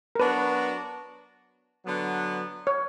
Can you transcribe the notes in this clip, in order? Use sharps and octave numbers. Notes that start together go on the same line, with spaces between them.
A#4
F#3 B3 D4 F#4 B4
D3 F#3 B3
C#5